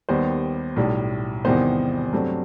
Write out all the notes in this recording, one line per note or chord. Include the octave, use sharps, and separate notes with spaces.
D#2 D#3 G3 B3 C5
B1 A2 G3
E2 C3 D#3 G3 B3 C5
G2 F#3 A3 C4